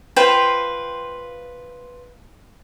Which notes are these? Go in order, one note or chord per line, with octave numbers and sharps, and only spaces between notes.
F4 B4 C5 G5